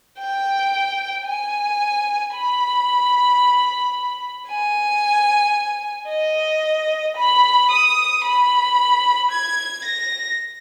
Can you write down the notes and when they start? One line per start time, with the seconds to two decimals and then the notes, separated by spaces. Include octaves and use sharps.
0.19 G5
1.27 G#5
2.35 B5
4.49 G#5
6.09 D#5
7.17 B5
7.70 D#6
8.24 B5
9.31 G#6
9.85 A#6